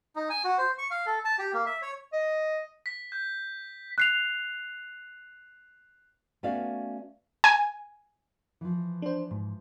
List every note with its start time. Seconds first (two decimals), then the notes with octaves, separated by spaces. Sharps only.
0.16 D#4
0.30 G#5
0.44 F#4
0.58 C5
0.78 C#6
0.91 F5
1.06 A4
1.25 A5
1.39 G4
1.54 A#3
1.66 E5
1.82 C#5
2.13 D#5
2.86 B6
3.12 G6
3.98 F#6 C7 F7
6.43 A3 B3 C#4 F#4 D5 F5
7.44 G#5
8.61 E3 F3
9.02 D4 C5
9.31 G#2